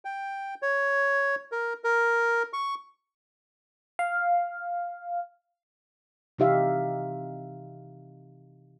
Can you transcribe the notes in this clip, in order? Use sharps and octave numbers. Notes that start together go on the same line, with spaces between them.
G5
C#5
A#4
A#4
C#6
F5
C3 E3 D#4 G4 E5 F5